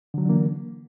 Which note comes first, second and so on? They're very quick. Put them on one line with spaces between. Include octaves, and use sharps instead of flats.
D3 F#3 E3 D4 A#3